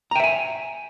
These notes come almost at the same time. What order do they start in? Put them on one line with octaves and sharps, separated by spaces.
A#5 G5 E5 G#5